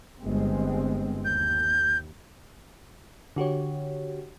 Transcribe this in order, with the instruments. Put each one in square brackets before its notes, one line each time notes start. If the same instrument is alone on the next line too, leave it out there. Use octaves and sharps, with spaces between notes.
[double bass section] G1 G#3 C4
[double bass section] D#2 [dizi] G6
[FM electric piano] D3 F#4 G4 C#5